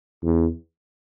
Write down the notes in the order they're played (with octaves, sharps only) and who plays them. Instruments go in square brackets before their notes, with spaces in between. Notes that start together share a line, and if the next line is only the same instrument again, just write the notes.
[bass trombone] E2